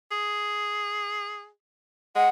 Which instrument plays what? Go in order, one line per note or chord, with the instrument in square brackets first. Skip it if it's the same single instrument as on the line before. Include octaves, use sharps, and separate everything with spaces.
[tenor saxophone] G#4
[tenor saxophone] G#3 [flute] F#5